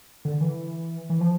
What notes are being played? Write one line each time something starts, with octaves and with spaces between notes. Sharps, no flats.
D3
E3
E3
F3